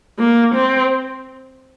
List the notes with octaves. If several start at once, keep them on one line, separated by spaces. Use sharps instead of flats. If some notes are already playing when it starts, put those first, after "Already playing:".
A#3
C4